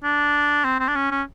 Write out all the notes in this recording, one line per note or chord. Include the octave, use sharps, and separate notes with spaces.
D4
C4
C4
D4
C#4
C#4